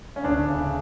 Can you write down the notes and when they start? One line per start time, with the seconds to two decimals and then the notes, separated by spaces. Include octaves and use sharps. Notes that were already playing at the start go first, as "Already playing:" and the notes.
0.16 C#4
0.24 D2 D4
0.48 C#3